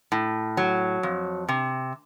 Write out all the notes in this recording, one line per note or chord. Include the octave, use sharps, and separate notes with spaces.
A2
F#3
F2
C3